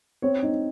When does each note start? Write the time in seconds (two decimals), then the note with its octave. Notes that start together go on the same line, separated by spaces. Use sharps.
0.22 C4 C#5
0.43 D#4